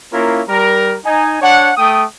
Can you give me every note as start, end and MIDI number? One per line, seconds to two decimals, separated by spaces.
0.13 0.42 58
0.13 0.42 61
0.13 0.42 64
0.13 0.42 65
0.13 0.42 70
0.49 0.96 55
0.49 0.96 70
1.05 1.37 63
1.05 1.37 80
1.42 1.71 62
1.42 1.71 73
1.42 1.71 78
1.77 2.05 57
1.77 2.05 79
1.77 2.05 87